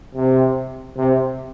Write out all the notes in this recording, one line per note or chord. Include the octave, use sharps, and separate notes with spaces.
C3
C3